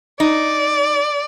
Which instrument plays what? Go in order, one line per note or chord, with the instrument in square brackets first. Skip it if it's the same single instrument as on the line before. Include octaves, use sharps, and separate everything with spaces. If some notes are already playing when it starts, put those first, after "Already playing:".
[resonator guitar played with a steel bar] D#4 [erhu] D5